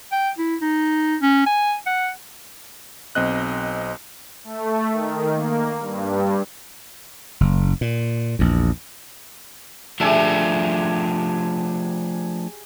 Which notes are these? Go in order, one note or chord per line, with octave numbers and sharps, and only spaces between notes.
G5
E4
D#4
C#4
G#5
F#5
B1 C4 D#5 F#6
A3
D#3
A#3
G2
F#1
A#2
A#1 E2
F3 A3 D4 G4 G#4 E5